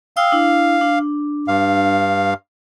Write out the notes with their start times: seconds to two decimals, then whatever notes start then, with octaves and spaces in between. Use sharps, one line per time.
0.17 F5 G5 D#6 E6
0.32 D4 E4
0.81 D4
1.48 G2 F5